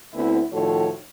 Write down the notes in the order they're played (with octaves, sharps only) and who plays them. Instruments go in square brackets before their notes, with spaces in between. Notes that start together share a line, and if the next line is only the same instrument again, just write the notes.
[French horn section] D2 B3 C4 E4
A2 D#3 F3 F#4 A4 C#5